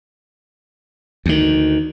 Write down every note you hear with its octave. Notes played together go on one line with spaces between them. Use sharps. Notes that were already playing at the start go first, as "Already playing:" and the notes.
D2 D#3